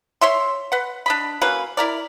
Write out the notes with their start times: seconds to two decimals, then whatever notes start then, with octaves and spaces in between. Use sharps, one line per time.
0.21 C#5 E5 C6
0.72 B4 F#5
1.06 D4 D#5 B5
1.41 F#3 A#3 C#4 B4
1.77 E4 A#4 D5